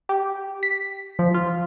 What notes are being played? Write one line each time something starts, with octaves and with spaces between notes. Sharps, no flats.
G4
B6
F3
F4